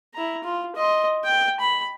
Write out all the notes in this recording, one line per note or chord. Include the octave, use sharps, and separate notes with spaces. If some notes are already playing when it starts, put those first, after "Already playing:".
E4 A#5
F4
D#5 C6
G5
B5